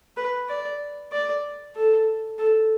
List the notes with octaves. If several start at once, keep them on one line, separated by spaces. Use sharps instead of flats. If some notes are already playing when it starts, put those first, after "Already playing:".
B4
D5
D5
A4
A4